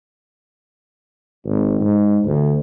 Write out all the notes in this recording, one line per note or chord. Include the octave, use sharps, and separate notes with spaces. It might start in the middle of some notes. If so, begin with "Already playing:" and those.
G#1
G#2
D2